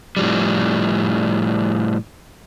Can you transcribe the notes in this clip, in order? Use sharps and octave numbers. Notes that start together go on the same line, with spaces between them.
A2 F3 G3